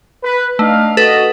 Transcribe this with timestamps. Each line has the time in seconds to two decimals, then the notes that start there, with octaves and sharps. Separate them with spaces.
0.24 B4
0.59 A3 D4 D#4 F5
0.97 F#4 A4 B4 D#5